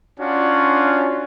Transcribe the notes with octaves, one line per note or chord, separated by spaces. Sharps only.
C#4 D4 F4 F#4